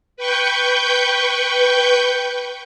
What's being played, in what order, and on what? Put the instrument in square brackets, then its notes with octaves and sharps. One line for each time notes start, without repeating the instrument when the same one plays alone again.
[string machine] B4 G5 C#6 G6